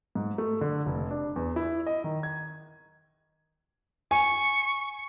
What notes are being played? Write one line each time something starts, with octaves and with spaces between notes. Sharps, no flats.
G#2
A3
D3
F1
D4
E2
E4
D#5
D#3
G#6
G#5 C#6